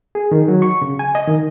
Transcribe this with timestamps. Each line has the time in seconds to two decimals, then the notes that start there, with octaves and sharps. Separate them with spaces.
0.15 G#4
0.32 D#3
0.48 F#3
0.62 C#6
0.82 C#3
0.99 G#5
1.15 D#5
1.27 D#3